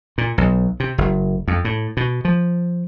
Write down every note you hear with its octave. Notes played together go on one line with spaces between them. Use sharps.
A#2
B1
C3
F#1
F2
A2
B2
F3